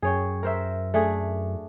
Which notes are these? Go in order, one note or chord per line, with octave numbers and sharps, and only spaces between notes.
F#2 G#4 C#5 G5
A#4 C5 E5
A3 D4 G#4